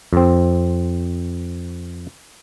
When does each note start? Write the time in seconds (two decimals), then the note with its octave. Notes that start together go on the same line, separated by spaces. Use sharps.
0.13 F2 C4